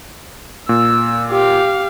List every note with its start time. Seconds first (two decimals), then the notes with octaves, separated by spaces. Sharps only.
0.69 A#2 E6
1.31 G4 F5